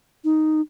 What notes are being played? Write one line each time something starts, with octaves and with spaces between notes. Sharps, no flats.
D#4